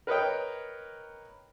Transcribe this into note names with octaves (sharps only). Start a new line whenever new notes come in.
A#4 B4 C#5 D#5 G5